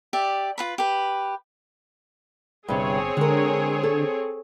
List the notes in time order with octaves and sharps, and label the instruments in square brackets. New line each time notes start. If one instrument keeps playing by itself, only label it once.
[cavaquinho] G4 D5 E5
F4 B4 B5
G4 B4
[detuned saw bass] G1 [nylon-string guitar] G2 C3 [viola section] C4 G#4 C#5
[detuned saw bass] D3 [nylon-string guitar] G#3 A#4
[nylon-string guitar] A4